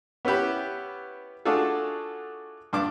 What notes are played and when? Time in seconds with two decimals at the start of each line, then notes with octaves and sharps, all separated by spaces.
0.25 B3 C#4 E4 G4 B4
1.45 A3 D4 F4 F#4 G#4 A4
2.73 G2 D4 D6